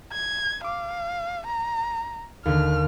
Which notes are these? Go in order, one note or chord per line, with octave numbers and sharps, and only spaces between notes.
G#6
F5 D6
A#5
D#2 D3 F6